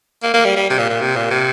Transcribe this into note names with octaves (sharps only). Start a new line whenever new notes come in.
A#3
A#3
G3
G3
C3
A#2
A#2
C3
A#2
C3